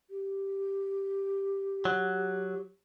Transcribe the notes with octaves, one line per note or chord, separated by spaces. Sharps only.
G4
F#3